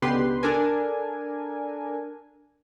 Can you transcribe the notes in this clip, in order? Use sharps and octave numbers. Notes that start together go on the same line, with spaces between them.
C#2 B2 D3 G4 B4 C6
D4 A4 A#4 G#5